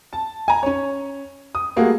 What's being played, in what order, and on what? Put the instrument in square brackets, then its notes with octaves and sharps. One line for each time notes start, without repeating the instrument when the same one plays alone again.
[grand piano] A5
G#5 A#5
C#4 C#5
D#6
G3 A3 A#3 F#4 G#4